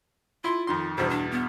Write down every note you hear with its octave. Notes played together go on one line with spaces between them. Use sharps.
E4 F4 C6
F2 D#3 C6
E2 G2 B2 C5
D4
B3